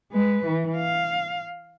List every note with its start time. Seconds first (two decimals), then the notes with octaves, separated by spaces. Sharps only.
0.12 G#3 B4
0.46 E3
0.76 F5